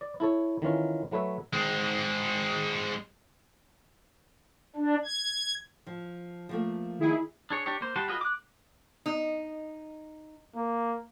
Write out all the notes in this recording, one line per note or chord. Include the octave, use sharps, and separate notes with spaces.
D5
E4 A4 C#5
D#3 E3 C#4 F4
F#3 A3 B4 C#5 E5
G#3 C4
D4
G#6
F3
F3 A3 A#3
D#3 E4 G#4
D4 G#4 C#5
D4 G4 C#5
A#3 C5
G3 G4 F#5 A5 C6
F4 F#4 G#4 B4 D#5
D6 F#6
D#4
A#3